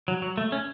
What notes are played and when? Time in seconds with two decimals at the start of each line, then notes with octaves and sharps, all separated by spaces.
0.08 F#3
0.22 F#3
0.38 A3
0.52 C#4